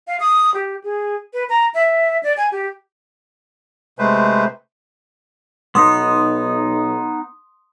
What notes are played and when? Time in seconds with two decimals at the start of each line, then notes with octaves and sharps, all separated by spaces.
0.07 F5
0.20 D#6
0.54 G4
0.84 G#4
1.33 B4
1.49 A#5
1.74 E5
2.23 D5
2.37 G#5
2.52 G4
3.99 C3 G#3 A3 B4 C5
5.75 B1 B3 D#4 C6 D#6